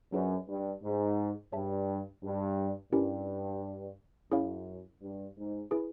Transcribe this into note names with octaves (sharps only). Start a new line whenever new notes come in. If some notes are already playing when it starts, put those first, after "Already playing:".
F#2 D4 F4 G#4 B4 D5
G2
G#2
G2 G#4 C#5 E5 A5
G2
G2 C#4 E4 G4 A#4
F#2 C#4 E4 G#4 C#5 F5
G2
G#2
E4 G#4 B4